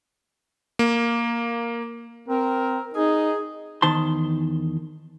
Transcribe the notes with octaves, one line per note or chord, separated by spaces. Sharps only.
A#3
C4 A#4
D#4 G#4
E2 D#3 C5 A5 C6